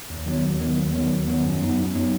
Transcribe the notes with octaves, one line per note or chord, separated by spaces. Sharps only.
D#2
D#3 F#3 B3
D#2
D#3 F#3 B3
D#2
D#3 F#3 B3
D#2
D#3 F#3 B3
F#2
F#3 B3 D#4
F#2
F#3 B3 D#4